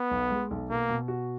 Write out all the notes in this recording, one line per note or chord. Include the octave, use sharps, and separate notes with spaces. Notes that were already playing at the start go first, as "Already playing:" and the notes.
Already playing: B3
B1
G#3
B1
B2 A#3
B2
F#4